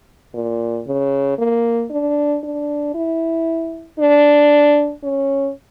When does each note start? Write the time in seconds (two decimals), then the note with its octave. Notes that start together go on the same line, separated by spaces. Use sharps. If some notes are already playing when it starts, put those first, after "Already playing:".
0.34 A#2
0.87 C#3
1.38 A#3
1.91 D4
2.43 D4
2.94 E4
3.99 D4
5.04 C#4